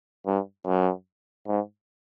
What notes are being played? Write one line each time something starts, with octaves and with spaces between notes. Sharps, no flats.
G2
F#2
G#2